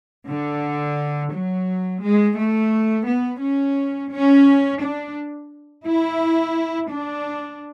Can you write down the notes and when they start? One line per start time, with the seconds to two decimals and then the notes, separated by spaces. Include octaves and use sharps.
0.28 D3
1.33 F#3
2.02 G#3
2.37 A3
3.07 B3
3.42 C#4
4.11 C#4
4.81 D4
5.86 E4
6.91 D4